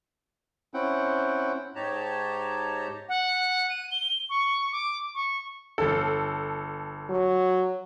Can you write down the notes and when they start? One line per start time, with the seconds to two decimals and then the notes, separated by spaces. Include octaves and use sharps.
0.74 C4 C#4 E4 F#5 G5
1.75 G#2 D#4 G4 C#5 A5 A#5
3.09 F#5
3.70 D#7
3.92 G7
4.30 C#6
4.72 D6
5.15 C#6
5.78 G1 A4
7.10 F#3